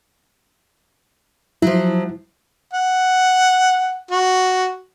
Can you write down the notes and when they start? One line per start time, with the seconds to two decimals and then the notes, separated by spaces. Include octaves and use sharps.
1.62 F3 F#3 E4
2.74 F#5
4.11 F#4